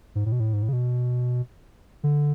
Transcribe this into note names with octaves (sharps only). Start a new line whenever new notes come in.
G#2
A2
B2
A2
G#2
A2
C#3
B2
D3